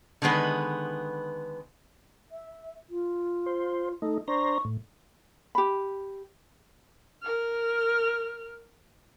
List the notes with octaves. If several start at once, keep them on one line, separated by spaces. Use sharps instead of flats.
D3 D#3 G#3 B3 B4
E5
F4
C5
A3 D#4 A4
D4 C5 A#5 C#6
A2
G4 B5
A#4 F6